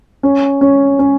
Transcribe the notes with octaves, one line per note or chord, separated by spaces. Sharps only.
C#4
C#4
C#4